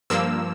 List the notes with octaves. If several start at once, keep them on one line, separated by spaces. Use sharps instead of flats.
G2 F3 A#3 E6